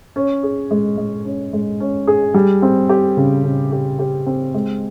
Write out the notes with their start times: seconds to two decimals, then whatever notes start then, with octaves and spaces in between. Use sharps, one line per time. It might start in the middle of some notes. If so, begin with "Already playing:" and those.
0.16 C#4
0.43 G#4
0.71 G#3
0.97 G#3
1.25 C#4
1.53 G#3
1.80 C#4
2.07 G#4
2.34 G3
2.62 C4
2.89 G4
3.17 C#3
3.44 C#3
3.72 G4
3.99 G4
4.27 C4
4.54 G#3